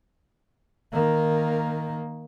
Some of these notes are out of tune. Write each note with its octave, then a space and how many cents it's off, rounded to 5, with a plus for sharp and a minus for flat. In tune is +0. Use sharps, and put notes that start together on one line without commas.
D#3 +0 A#3 +0